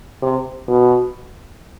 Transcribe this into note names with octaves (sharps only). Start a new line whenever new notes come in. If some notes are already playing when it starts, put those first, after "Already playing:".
C3
B2